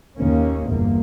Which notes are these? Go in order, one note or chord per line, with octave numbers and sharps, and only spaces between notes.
D#2 A#3 C#4
G1 E2 G2 A#2 A#3